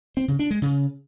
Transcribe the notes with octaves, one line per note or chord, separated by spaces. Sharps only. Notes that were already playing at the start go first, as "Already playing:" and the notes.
C4
C#3
D4
G#3
C#3